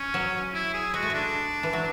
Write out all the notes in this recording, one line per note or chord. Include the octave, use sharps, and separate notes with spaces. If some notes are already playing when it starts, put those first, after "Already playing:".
Already playing: C#4
F#3
E4
G#4
G#3 F#4
A3
G#3 D4
E3
F#3